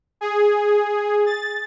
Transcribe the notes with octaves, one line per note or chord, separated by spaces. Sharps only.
G#4
A6